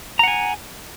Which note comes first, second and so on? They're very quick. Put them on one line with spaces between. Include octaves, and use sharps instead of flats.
A#5 F#5 G#5